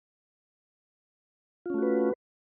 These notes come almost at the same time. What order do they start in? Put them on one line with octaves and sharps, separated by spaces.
F4 C#4 A3 F#4 B4